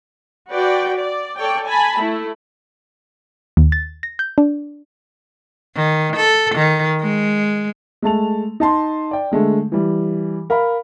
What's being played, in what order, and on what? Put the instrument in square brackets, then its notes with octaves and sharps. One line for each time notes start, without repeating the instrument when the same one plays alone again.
[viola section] F#4 B4 D5 G5
D5
A4 C#5 D5 G5
G#5 A5 B5
A3 E4
[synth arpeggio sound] D#2
A6
A#6
G6
D4
[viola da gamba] D#3
A4
D#3
G#3
[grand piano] G#3 A3 A5 F7
D#4 A5 C6
D5 G5
D3 G#3 A3
E3 G3
A#4 F5 B5